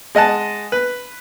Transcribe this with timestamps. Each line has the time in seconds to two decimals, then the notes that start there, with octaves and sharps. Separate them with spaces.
0.15 G#3 D#5 F#5 A5
0.72 B4